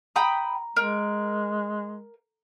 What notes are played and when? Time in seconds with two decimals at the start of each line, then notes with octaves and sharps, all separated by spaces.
0.16 G5 A#5 B5 D#6
0.76 G#3 A#4